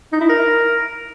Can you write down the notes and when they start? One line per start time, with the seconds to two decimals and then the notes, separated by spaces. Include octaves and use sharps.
0.12 D#4
0.21 E4
0.29 A#4